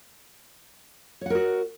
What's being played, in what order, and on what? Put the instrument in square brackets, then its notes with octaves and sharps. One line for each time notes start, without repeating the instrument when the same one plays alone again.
[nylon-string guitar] C#5
F#5
A#4
F#4